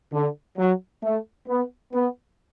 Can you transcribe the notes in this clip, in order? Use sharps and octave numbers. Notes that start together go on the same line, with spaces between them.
D3
F#3
A3
B3
B3